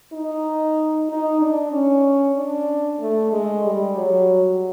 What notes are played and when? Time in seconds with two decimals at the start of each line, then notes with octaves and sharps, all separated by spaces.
0.12 D#4
1.09 D#4
1.41 D4
1.72 C#4
2.36 D4
3.00 A3
3.32 G#3
3.65 G3
3.97 F#3